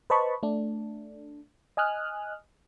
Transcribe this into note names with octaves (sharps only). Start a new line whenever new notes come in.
B4 C5 D#5 A5 B5 C#6
A3 D4
D#5 G#5 D#6 F6 F#6